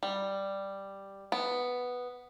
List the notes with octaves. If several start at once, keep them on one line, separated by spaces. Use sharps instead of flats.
G3
B3